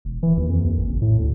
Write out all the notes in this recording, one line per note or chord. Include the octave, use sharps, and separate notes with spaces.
E1
E3
D#2
F2
D#2
A1
F#1
A2
D2